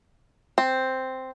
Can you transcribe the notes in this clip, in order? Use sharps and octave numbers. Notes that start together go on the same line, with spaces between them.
C4